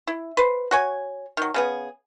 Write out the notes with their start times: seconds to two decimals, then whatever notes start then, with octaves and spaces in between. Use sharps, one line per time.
0.07 E4
0.37 B4 C5
0.71 F#4 C#5 G#5
1.37 D#3 F#3
1.54 C#3 B3 G#4